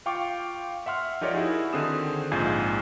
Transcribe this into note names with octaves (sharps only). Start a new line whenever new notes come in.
F4 F5 G5 C#6 D6
E5 F#5 C6 F6
F3 D#4 G4 A#4 C#5 D5
E4 F#4 G#4
D3 D#3 C4 G#4 D#6 E7
A#1 G#2 F4 G#5 G6 G#6